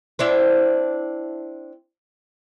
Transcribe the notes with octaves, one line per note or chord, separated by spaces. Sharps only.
C4 D4 E4